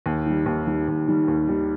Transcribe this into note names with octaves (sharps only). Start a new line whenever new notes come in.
D#2
D#3 G3
D#2
D#3 G3
D#2
D#3 G3
D#2
D#3 G3